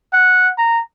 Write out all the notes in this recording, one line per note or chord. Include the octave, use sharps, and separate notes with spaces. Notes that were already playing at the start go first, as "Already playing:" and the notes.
F#5
A#5